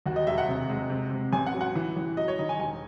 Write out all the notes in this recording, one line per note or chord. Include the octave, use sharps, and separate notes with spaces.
D#2 F#4
D#5
E1 E5
F#5
C3
G#3
C3
C3
A1 G#5
F#5
F#3
F#5
E3
A1
F#3 D#5
C#5
D#3 D#5
G#5
E1 G#5